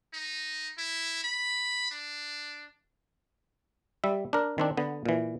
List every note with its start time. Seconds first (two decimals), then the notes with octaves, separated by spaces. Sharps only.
0.13 D#4
0.78 E4
1.24 B5
1.91 D4
4.04 G3 E5
4.33 D4 A#4
4.58 D#3 C4 D4
4.77 D3 B3
5.05 A#2 E3